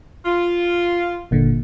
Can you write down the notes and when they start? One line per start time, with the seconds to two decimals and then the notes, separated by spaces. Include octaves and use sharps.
0.26 F4
1.31 G1 A#2 D3